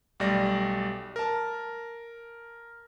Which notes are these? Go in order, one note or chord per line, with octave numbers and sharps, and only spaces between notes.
B1 G3 A3 D5 A#6
A#4 A5